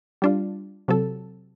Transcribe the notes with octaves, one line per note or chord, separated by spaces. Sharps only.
G3 D4 F4
C3 F#3 A4